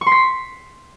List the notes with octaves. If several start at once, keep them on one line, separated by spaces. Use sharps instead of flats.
C#6
C6
B6